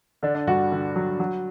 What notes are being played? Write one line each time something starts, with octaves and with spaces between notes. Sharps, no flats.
D3 D4
D4
G2 F#4
D3
F#3
F#3